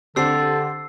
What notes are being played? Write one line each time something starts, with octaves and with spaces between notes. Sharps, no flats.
D3 C4 D4 G4 A4 E6 C7